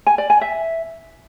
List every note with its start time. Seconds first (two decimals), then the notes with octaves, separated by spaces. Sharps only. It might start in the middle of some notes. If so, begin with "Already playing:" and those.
0.06 G#5
0.18 D5
0.30 G#5
0.41 E5